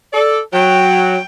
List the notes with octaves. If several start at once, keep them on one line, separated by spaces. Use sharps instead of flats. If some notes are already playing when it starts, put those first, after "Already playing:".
A4 D5
F#3 G5